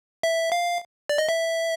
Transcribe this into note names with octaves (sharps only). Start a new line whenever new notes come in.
E5
F5
D5
D#5
E5